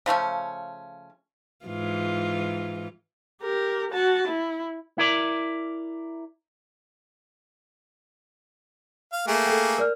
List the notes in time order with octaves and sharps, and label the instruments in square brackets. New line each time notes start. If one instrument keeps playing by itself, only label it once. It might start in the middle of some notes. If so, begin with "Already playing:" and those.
[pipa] C#3 F3 A3 C#4
[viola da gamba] G#2 E3 F4
[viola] G4 A#4
F#4 A5
E4
[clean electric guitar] E4 A#4 D5
[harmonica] F5
A3 A#3 G#4
[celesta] A4 G5
A#4 D5 F6